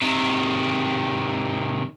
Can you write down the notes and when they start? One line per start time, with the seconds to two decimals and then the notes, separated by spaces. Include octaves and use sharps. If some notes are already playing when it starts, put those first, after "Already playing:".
0.02 C3 D#3